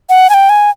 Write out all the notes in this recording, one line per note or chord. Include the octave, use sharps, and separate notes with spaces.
F#5
G#5
G5
G#5